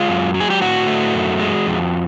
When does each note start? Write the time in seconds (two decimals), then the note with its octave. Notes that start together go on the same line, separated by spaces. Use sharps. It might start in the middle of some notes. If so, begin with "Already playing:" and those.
Already playing: G#3 F4
0.09 F#2
0.34 F#3
0.40 G#4
0.50 G4
0.61 A2 F#4
0.87 A3
1.14 F#2
1.40 G#3
1.66 F2